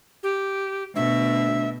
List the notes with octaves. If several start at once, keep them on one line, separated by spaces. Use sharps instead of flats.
G4
D2 B2 E5